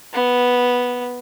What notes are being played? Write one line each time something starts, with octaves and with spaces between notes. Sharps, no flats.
B3